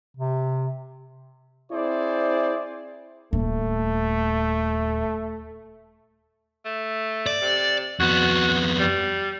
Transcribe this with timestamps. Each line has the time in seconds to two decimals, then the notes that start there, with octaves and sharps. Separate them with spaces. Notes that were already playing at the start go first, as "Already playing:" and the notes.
0.17 C3
1.73 C4 E4 G#4 C5 D5
3.33 D#1 A3
6.65 A3
7.26 D5
7.42 C3
8.00 F2 B3 F#4
8.80 G3